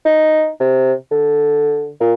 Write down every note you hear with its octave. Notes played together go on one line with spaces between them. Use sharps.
D#4
C3
D3
A#2